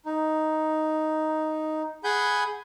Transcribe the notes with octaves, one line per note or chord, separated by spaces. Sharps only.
D#4
G#4 F#5 G#5 B5 G6